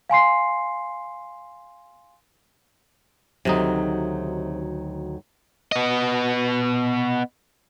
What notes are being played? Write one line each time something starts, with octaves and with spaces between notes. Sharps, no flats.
F5 G#5 C6 C7
D2 C3 D#3 F#3 D#4
B3 D#5